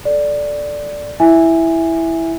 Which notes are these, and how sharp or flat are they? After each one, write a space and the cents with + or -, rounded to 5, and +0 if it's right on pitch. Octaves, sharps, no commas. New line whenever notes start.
A4 +0 D5 +0
E4 +0 E5 +0 G#5 -10